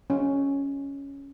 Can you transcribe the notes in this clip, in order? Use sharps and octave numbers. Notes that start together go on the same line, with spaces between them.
C#4